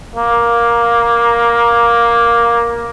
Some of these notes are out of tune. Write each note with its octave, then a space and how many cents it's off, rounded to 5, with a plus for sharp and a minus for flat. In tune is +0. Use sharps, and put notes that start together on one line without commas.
A#3 +10